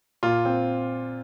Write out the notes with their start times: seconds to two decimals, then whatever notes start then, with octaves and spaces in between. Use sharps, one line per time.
0.23 A#2 F4
0.45 C4